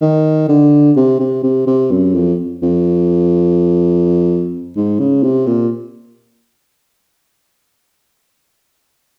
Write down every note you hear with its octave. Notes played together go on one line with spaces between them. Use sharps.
D#3
D3
C3
C3
C3
C3
F#2
F2
F2
G#2
C#3
C3
A#2